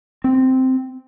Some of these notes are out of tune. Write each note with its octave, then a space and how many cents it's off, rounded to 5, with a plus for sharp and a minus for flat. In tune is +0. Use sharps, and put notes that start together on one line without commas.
C4 -5